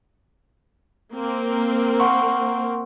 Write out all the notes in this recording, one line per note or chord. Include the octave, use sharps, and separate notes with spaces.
A#3 C4 A#4
F#5 C6 C#6